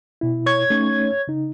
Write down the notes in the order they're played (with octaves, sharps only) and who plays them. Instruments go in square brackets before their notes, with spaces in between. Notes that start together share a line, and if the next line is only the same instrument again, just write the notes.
[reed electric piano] B2 E4
[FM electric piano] C#5 G#6
[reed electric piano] A3 C#4 D#4
C#3 D#4